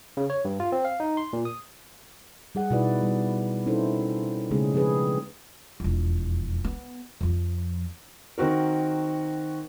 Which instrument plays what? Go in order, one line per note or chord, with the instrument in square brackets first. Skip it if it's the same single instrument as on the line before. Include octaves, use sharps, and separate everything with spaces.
[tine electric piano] C#3
C#5
G2
F4
C4
F5
D#4
C6
A#2
D#6
[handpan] G3 G#4 F#5
B2 D#4 E4 F#4 B4 D5
G3
C4 C#4 D#4 E4 A4 C5
C#3 G#3 A3 C#4 G#4
F3 C4 D4 G#4 B4
[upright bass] E1 F2
B3
F2 F3
[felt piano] D#3 C4 F#4 A#4